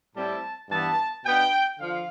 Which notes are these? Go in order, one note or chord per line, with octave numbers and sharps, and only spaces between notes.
A2 G3 C4 E4 A5
G2 E3 B3 A5
B2 B3 D4 G5
D3 F3 F5